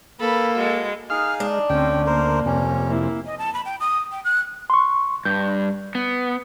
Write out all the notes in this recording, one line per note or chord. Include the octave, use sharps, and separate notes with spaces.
A#3 A4 B4 B5
G#3 F#4
D#4 G#4 F5 F6
G#3 D4
D2 C4 C#4 G5
A#3 A#4 C5
F2 C3 C#4
A#3 E4
D#5
A5
B5
G5
D#6
G5
F#6
C6 C#6
G2 G6
B3